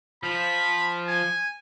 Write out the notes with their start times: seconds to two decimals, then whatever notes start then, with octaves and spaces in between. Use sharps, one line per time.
0.23 F3 B5
1.08 G#5